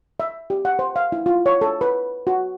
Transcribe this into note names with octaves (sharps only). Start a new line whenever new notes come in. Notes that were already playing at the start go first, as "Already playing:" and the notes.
E5
G4
F#5
C5
F5
E4
F4
C#5
A4
B4
F#4